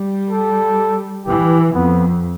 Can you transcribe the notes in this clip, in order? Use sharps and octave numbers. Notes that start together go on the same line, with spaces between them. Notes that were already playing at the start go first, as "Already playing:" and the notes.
Already playing: G3
A4
E3 G4
F2 B3